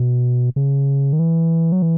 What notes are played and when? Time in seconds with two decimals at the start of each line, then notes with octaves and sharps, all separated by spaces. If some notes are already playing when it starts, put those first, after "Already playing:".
Already playing: B2
0.56 C#3
1.13 D#3
1.19 E3
1.72 F#3
1.82 E3